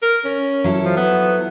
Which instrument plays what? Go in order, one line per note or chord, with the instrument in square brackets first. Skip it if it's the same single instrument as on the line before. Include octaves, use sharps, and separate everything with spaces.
[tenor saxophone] A#4
C#4
[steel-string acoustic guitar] F#3 E4 A4
[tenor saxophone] F3
B3